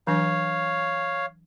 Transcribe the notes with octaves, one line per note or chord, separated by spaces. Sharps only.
E3 F#3 D4 C#5 F5